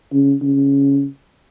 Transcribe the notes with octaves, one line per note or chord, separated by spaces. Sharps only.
C#3
C#3